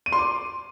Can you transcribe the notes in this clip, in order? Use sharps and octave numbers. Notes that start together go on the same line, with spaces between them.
D#7
C6
D6